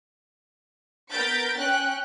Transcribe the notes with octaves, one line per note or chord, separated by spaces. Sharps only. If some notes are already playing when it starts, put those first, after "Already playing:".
B3 A#4 G6 A6 B6 D7
C#4 G5 F#6